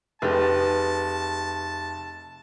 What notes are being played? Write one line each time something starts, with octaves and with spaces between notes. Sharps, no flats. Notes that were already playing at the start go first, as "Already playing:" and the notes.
F1 G4 G#4 B4 A5